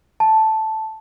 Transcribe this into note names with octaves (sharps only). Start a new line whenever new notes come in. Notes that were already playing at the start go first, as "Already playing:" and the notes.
A5